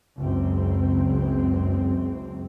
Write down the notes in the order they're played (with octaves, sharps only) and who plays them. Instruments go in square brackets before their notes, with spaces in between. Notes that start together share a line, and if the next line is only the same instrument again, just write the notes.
[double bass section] F#1 C#2 C4